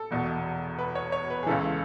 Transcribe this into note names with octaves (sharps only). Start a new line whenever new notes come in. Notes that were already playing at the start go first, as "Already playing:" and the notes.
Already playing: A4
E1 E2 B2
B4
C#5
C#5
B4
G#4
C#2 C#3 E3 A4